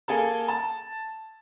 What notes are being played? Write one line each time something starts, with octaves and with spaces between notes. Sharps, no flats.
A#3 G#4 A4
A5